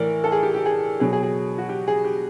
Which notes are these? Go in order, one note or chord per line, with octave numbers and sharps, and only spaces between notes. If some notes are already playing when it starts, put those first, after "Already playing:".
Already playing: A2 E3 A#4 D5
A4
G#4
G4
G4
G#4
B2 F#3 G#4
G#4
G#4
F#4
G4
G#4
G4